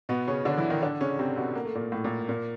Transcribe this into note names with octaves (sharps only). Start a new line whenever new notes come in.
B2 B3
C#3 C#4
D3 D4
E3 E4
D#3 D#4
D3 D4
C#3 C#4
C3 C4
B2 B3
A#3
A3
A#2 A#3
A2 A3
A#2 A#3
A#2 A#3